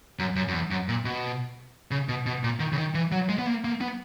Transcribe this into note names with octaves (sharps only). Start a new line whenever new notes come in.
F#2
F#2
F#2
E2
F#2
A#2
B2
C#3
B2
B2
A#2
D#3
C#3
D#3
E3
F#3
G#3
B3
A#3
A#3
B3